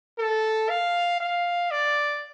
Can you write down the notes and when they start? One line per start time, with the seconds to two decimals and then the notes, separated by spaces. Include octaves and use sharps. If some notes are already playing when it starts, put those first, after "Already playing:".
0.19 A4
0.69 F5
1.20 F5
1.71 D5